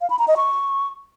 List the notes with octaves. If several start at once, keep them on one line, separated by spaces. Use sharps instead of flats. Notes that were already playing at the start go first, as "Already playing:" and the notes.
F5
B5
A#5
D#5
C#6